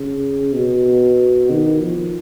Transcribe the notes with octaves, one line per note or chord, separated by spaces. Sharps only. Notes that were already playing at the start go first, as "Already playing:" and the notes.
Already playing: C#3
B2
D#3
F3